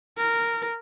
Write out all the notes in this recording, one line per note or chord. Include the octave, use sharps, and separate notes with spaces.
A#4